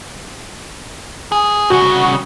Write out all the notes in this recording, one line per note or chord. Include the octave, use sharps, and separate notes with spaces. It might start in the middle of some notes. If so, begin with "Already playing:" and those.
G#4
C2 C#3 F#4